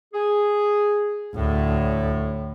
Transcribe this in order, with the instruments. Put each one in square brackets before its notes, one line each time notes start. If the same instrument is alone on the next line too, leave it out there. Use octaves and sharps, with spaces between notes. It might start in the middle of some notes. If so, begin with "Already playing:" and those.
[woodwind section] G#4
[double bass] D2 [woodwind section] A2